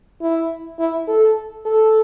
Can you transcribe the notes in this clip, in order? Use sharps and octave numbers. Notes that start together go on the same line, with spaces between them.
E4
E4
A4
A4